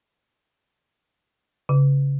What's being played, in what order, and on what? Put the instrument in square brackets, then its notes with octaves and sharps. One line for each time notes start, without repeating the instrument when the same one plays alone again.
[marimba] C#3